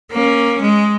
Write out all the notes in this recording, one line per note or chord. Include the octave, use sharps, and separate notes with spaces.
A#3 C#4
G#3